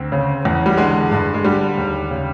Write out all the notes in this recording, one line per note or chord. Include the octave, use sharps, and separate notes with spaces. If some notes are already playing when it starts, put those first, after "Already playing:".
Already playing: D2 C4
C#3
E2
G3
D3 G#3
G2
G#3
D3 G3
D#2
C#3